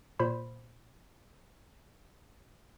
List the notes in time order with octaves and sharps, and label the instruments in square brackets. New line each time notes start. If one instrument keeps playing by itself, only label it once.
[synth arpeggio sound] A#2 C5 B5